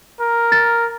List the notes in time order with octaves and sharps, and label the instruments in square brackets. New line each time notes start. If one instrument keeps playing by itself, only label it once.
[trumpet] A#4
[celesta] A6